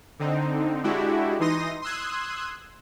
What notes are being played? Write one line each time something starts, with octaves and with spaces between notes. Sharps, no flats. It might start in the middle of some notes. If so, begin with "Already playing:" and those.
D3 C4 D#4
G#3 D4 E4 F#4 G4
E3 D#4 C6 D#6 A#6
C6 D#6 E6 F#6 G#6